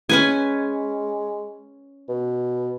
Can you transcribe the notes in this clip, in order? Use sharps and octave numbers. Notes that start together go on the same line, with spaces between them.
G#3 C#4 B4 G#5
B2